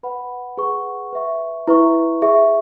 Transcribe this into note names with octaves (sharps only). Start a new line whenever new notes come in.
B4 F#5 B5
G#4 B4 F#5 C#6
B4 E5 C#6
E4 B4 E5 C#6
G#4 E5 C#6